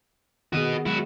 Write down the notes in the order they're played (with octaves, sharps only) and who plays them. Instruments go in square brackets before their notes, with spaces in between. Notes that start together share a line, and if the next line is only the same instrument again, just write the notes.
[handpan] D#3 B3 G#4 [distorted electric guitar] F#4 D#5
[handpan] F#3 G#3 [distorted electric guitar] E4 F#4